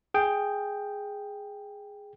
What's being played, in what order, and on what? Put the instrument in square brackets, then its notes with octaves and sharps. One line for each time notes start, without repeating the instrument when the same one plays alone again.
[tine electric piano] G#4 G5